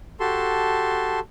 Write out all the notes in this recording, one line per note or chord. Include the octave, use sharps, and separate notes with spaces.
F#4 G4 A4 A5 C6